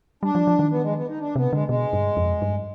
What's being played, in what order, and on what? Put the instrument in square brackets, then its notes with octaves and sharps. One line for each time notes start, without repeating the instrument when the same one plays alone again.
[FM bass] G3 [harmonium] D4
[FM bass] F3
F3
D#3
[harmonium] B3
G#3
B3
D#4
D4
[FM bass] C3 [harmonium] B3
[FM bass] D3 [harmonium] G#3
[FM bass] B2 [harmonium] G#3
[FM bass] G2
F2
G2